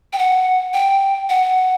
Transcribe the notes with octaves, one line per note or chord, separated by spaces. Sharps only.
G5
F#5
G5
F#5